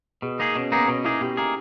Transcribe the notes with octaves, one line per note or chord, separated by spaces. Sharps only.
B2 G#4
A#3 D#4 G#4
B2 C#4
A#3 B3 D#4 G#4
B2 C#4
A#3 D#4 E4 G#4
B2 G4
A#3 D#4 G#4